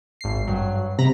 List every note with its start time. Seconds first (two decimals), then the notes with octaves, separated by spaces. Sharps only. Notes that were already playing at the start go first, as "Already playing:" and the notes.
0.21 G#1 C7
0.47 G2 F#3
0.99 C3 A#5 B5 A#6